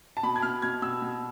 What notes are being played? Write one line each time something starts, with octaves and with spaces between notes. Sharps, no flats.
A5
B2 B5
G#6
B2 F6
B2 G#6
B2 E6
B2